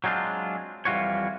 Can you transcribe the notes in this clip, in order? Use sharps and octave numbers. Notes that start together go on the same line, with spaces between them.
F#3 G#3 C4 D4 F4
F2 E3 G3 F4 F#4 C#5